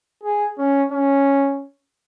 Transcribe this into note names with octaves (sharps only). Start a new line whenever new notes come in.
G#4
C#4
C#4